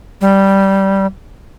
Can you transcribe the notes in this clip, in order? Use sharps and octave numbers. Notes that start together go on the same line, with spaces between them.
G3